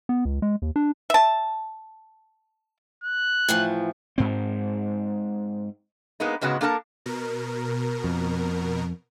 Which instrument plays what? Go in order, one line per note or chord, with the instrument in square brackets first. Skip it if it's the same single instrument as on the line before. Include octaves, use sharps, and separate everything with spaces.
[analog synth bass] B3
C#2
G#3
D#2
D4
[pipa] E5 A5
[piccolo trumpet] F#6
[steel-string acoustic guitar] A2 E3 F3
[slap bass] G#2 C4
[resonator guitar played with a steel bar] G#3 A#3 B3 D#4
G#2 C#3 G#3 B3 F#4
A#3 D4 A4 A#4 G5 A5
[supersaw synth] B2 A#4
[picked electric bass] F2